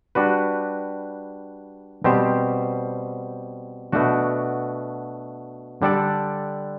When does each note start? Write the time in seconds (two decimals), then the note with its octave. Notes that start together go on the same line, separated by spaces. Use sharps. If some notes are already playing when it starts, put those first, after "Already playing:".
0.15 G3 D4 F#4 B4
2.04 B2 G3 C4 G4 C5
3.92 B2 A3 D4 F#4
5.82 D3 G3 D4 A4 D5